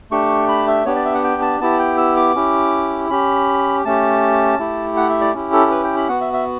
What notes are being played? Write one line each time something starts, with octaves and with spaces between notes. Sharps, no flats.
A3 D4 G4 C#6
B5
E5
B3 D4 G4 C#5
D5
E5
F#5
G5
A5
B3 E4 G4 A5
G5
E6
D6
C#4 E4 G4
C#4 G4 B5
A3 C#4 G4 A5
A3 E4 G4
F#5
E5
D5
C#4 E4 G4
A4
B4
G5
B5
B3 F#4 F#5
E5
E5